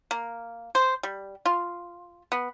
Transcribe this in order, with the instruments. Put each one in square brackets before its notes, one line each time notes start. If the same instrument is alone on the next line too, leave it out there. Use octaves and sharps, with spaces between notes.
[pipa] A#3
C5
G3
F4
B3